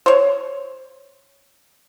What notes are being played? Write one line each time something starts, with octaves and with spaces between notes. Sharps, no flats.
C5 C#5